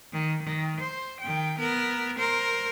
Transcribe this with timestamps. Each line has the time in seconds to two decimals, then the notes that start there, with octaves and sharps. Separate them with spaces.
0.12 D#3
0.42 D#3
0.80 C5
1.20 D#3 G5
1.59 B3 A#4
2.18 A#4 C5